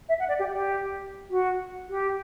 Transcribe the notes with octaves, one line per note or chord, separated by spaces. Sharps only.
E5
F#5
D5
G4
G4
F#4
G4